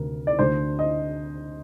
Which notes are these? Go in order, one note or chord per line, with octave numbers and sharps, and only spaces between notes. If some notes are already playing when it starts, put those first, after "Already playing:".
Already playing: D2 C3 D#3 A#4
D5
D2 D3 C5
D#5